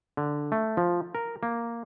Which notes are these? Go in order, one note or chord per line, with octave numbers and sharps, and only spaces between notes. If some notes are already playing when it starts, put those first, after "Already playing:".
D3
A3
F3
A#4
A#3